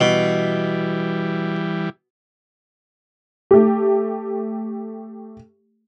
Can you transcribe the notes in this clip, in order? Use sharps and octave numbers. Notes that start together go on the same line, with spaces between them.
B2 E3 G3
A3 G4